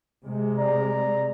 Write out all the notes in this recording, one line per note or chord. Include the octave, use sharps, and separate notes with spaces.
C3 G#3
D5 A#5